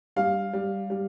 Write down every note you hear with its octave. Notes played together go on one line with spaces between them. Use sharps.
G3 F5
G3
G3